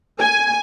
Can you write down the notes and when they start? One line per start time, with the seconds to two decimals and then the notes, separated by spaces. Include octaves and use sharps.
0.20 G#5